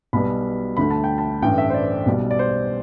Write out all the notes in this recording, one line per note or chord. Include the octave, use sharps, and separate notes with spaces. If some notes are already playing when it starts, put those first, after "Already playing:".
B1 B2 G3 B3 B5
D2 D3 A3 B5
A5
G5
A5
A1 G2 E3 A3 G5
E5
C5
D5
B1 B2 G3
D5
C5